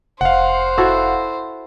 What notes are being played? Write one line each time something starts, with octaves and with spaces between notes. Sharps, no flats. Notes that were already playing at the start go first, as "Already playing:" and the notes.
F1 C5 F5 F#5
E4 F#4 A4